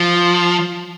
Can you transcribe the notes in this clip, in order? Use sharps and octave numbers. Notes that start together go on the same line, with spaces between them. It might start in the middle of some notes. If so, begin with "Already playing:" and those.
Already playing: F3